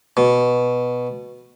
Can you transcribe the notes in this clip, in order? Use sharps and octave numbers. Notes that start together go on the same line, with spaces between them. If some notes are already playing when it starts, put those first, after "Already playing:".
B2